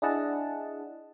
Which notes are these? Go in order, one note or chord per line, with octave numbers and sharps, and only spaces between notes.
D4 E4 G#4 D#5 F#5 A5